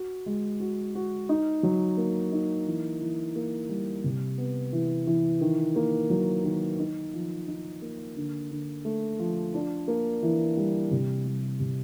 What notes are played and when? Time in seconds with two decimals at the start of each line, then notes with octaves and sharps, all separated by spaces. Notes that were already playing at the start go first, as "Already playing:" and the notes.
Already playing: F#4
0.26 G#3
0.60 F#4
0.95 F#4
1.29 D#4
1.63 F#3
1.97 A#3
2.32 D#4
2.67 E3
3.01 E3
3.36 A#3
3.69 G3
4.04 C3
4.38 B3
4.73 E3
5.07 E3
5.41 D#3
5.76 A#3
6.10 F#3
6.45 D#3
6.79 D#4
7.13 F3
7.48 D#4
7.82 A#3
8.16 D3
8.51 D3
8.85 A3
9.19 F3
9.54 D4
9.88 A#3
10.23 E3
10.57 G3
10.91 C3
11.26 G3
11.60 C3